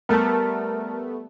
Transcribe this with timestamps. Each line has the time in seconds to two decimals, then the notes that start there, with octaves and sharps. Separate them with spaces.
0.09 G3 A3 B3 A#4 A5